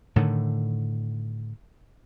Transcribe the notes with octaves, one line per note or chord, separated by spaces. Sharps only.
A2 D3 D#3